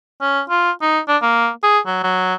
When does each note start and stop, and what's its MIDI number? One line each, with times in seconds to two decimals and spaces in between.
0.22 0.41 61
0.50 0.71 65
0.82 0.99 63
1.09 1.17 62
1.22 1.49 58
1.63 1.79 68
1.86 2.03 54
2.04 2.34 54